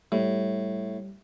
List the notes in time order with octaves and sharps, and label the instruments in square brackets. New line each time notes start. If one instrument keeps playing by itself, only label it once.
[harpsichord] A2 [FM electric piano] G3